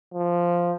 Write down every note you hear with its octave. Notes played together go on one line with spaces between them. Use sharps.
F3